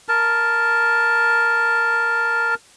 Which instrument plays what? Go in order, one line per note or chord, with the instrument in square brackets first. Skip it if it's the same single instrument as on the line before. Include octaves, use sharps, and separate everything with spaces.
[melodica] A#4 A5